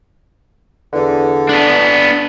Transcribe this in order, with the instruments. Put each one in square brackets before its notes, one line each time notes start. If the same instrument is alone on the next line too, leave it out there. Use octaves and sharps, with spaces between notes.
[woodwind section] E2 D3
[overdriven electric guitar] B3 D4